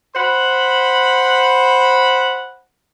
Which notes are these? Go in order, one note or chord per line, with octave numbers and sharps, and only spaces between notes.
C5 F#5 B5